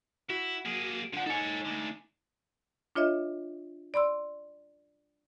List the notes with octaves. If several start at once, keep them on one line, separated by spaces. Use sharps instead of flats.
E4 F#4
A#3 G#4
D3 F3 F#5
D#4 A4 C#5 G#5
D2 D3
D4 F4 C#5 D#5 E5
D5 B5 C6 E6